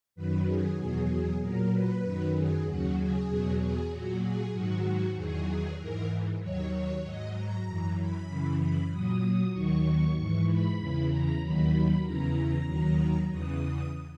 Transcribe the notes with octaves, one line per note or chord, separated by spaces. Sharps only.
F#2 D#3 F#3 B4
G#4
E2 B2 F#3 G#4
A#2 F#3 A#4
B4
F#2 D#3 F#3
G#4
D#2 C#3 F#3 F#4
G#4
E2 B2 F#3
G#4
A#2 F#3 F#4
G#4
G#2 D#3 F#3 F#4
E2 D#3 F#3 G#4
G#2 E3 A#4
D#2 D#3 F#3 C#5
C#5
G#2 F#3 D#5
A#5
F#2 E3
B5
F#2 C#3 E3
B5
A#2 F#3 D#6
D#2 D#3 F#3 C#6
G#2 E3
B5
E2 C#3 E3
A#5
D#2 D#3 F#3 B5
E2 C#3 E3 A#5
D#2 D#3 F#3
E2 C#3 E3 D#6